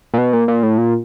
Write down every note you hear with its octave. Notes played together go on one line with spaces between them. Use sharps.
A#2
B2
A#2
A#2
A2
A#2